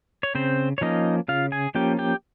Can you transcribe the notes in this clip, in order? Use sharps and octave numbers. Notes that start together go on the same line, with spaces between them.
C#5
C#3 C4 C5
C#5
F3 A#3 C#4 D#4 D#5
C#3 F4 F5
G#4 G#5
F3 A#3 C#4 G4 G5
G4 G5